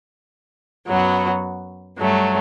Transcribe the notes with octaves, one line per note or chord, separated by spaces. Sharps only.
F#2 F#3 B3 F#4
G2 F#3 A3